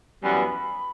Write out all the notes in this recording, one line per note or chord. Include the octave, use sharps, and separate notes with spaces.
F#2 E3 G3 B3 B5